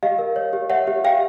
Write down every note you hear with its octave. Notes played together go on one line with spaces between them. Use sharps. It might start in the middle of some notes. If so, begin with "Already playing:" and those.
G4 D#5 F5
A#4
C#5
G4
C#5 E5 F#5
G4
G4 F5 G5